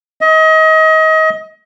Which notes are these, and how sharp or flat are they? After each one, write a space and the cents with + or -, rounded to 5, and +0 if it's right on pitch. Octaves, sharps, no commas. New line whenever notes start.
D#5 +30